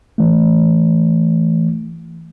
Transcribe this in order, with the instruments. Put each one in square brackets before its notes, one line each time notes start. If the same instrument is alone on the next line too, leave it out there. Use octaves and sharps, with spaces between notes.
[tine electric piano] E3 A3